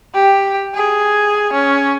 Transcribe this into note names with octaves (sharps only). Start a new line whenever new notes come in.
G4
G#4
C#4